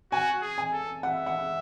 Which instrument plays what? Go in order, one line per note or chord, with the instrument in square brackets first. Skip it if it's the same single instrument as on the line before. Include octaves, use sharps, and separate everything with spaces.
[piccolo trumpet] F#4 [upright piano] G#5
[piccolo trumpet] G#4
[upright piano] G#5
[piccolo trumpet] A4
[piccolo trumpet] E5 [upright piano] F#5
[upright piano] F#5